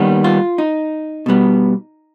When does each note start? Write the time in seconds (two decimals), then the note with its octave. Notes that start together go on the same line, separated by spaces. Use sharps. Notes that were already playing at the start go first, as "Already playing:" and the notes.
Already playing: D#2 D#3 G3 B3
0.24 F4
0.58 D#4
1.26 B2 G3 B3